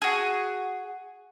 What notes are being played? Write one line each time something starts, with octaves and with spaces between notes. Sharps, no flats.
F#4 G#4